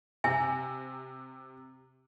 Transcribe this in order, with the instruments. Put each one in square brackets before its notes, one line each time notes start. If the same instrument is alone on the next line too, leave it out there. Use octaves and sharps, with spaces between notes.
[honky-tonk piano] C3 [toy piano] E5 G#5